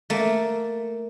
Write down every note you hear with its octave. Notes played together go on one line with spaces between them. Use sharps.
A3 A#3